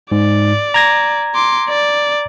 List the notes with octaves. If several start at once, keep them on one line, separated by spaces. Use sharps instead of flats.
G#2 D5
A#5 G#6 A#6
C6 D6
D5